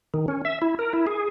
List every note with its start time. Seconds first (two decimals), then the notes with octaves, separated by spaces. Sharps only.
0.14 D#3
0.28 C#4
0.45 E5
0.62 E4
0.79 A#4
0.93 E4
1.07 G#4